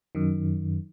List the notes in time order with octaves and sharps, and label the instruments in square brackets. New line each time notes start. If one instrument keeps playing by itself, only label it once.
[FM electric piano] F#2 D#3